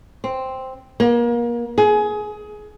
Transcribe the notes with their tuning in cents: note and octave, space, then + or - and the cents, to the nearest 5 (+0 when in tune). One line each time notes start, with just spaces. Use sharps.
C4 +0
A#3 +30
G#4 +20